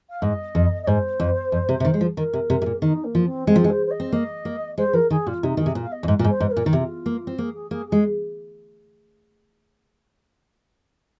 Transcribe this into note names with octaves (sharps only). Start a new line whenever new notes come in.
F5
G#2 D#5
F2
D#5
G#2 C5
F2
F2
C3
C3
D#3
G#3
F3
D#3 A#4
C3
C3
C3
A#2
D#3 D#4
A#3
F3
C4
G#3 C4
F3
G#3
C5
C5
D#5
C4
A#3 D#5
A#3
G#3 C5
F3 A#4
D#3 G#4
A#2 F4
C3 D#4
D#3 G#4
C3
A#2
F5
D#5
F2
G#2
A#2
G#2
C5
G#2
C5
A#4
A#2
D#3 D#4
C3 F4
A#3
C4
A#3 G#4
G#4
A#3 G#4
G#3 G#4